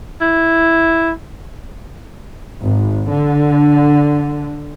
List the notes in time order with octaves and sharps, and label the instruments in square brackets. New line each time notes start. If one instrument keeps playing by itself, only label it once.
[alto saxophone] E4
[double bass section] G#1
D3